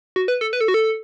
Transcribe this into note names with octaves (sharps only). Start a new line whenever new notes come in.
F#4
B4
A4
B4
A4
F#4
A4